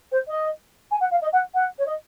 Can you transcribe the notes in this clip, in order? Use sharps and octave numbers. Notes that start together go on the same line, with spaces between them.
C5
D#5
G#5
F#5
F5
D#5
F#5
F#5
C#5
D#5